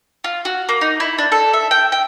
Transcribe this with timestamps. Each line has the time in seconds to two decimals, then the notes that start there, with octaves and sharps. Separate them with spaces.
0.24 F4
0.45 F#4
0.69 A#3
0.81 D#4
1.00 E4
1.18 D4
1.32 A4
1.53 E5
1.71 G5
1.92 G5